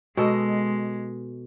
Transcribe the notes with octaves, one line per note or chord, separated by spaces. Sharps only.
B2 G#3 A4 D#5